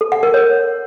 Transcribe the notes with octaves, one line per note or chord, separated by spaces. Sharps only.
A4
F#5
A#4
C#5